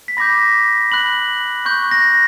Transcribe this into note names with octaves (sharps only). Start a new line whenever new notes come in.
B6
B5 D6 G6 A#6
B5 F#6 F#7
C#6 F#6 G6
A#6